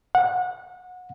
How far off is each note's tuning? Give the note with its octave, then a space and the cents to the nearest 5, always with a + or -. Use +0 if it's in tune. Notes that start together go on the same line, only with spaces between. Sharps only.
F#5 -25